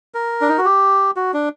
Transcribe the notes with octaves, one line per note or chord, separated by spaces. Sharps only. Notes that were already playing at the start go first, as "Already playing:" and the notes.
A#4
D4
D#4
F#4
G4
F#4
D4